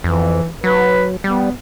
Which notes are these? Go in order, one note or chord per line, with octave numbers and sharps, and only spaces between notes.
F2 E3
F#3 B4
G3 B3